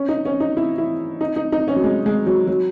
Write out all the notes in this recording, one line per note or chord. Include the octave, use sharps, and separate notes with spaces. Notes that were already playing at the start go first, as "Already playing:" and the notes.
Already playing: C#4
D#4
C#4
D#4
E4
E4
D#4
D#4
D#4
C#4
F#3
G#3
G#3
F#3
F#3